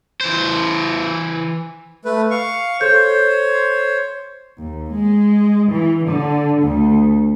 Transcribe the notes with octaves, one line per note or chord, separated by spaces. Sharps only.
E3 C5
A3 B4
F5 C#6
A4 C5 C#5 G6
D#2
G#3
E3
D3
D2